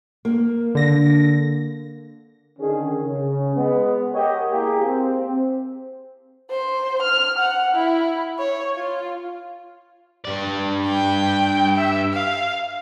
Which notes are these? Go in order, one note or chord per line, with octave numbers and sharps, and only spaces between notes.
A#3
D3 A#6
D3 D#3 C#4 G#4
C#3
G#3 B3
G4 A#4 C#5 D#5 F#5
A#3 E4 G4 G#4
C4
C5
F6
F#5
E4
C#5
F4
G2 D5
G5
E5
F5